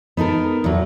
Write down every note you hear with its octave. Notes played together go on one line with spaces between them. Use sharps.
B3 D#4 A4 A#4
E2 F#3